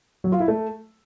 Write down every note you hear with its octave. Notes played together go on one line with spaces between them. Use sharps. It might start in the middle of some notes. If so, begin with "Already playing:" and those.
F#3
F4
E4
A3